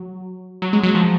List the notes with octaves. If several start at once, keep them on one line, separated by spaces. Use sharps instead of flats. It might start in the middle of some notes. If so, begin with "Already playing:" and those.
Already playing: F#3
F#3
G#3
F#3
F3